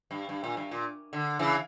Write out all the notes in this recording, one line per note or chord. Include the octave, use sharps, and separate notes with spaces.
G2
G2
A#2
G2
A#2
D3
C#3 E3